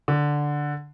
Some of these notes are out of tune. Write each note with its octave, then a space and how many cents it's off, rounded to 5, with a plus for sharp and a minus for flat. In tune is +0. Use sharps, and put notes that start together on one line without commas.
D3 +0